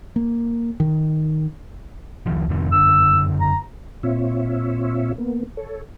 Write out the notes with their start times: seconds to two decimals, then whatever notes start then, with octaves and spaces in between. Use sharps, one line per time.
0.16 A#3
0.80 D#3
2.26 C#2 D#3 F3
2.49 F2 C3 D#3
2.72 F#1 D3 E6
3.41 A#5
4.03 A#2 C4 F4 C#5 E5
5.18 A#3 B3
5.57 A4 C#5